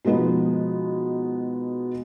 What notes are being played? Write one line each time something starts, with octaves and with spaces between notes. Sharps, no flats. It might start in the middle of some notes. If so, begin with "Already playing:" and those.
B2 F3 G#3 B3 D#4